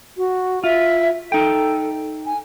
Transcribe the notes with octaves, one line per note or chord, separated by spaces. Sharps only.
F#4
F4 E5
D#4 A4 G5
G#5